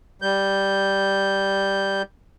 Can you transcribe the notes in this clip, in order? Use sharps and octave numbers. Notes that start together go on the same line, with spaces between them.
G3 G6